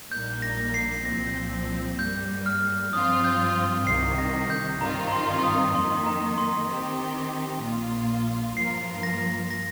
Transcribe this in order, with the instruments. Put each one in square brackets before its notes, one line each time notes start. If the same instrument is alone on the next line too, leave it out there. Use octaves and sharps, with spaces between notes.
[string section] A#1 A#2 G3 A#3 D#4 [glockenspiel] G6
[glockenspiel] A#6
C7
[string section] C2 A#2 F3 C4 [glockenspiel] A#6
[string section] G2 G3 A#3 [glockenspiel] G6
[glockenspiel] F6
[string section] G2 F3 C4 F4 [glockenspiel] D#6
[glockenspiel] G6
[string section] C2 C3 D#3 [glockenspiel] C7
[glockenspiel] A#6
G6
[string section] G2 D#3 C4 F4 [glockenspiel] A#5
[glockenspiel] A#5
C6
C6
D#6
[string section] F2 D#3 A#3 [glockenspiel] C6
[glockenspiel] A#5
C6
[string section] D#3 C4 G4
A#1 A#2 A#3 F4
[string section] G2 F3 A#3 F4 A#4 [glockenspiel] C7
[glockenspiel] A#6
A#6